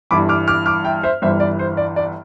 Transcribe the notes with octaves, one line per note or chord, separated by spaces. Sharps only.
G1 G2 E3 B5 D6
D6 F6
D6 F6
D6 F6
E5 G5
C5 E5
G1 G2 E3 C5 E5
D5
C5
D5
D5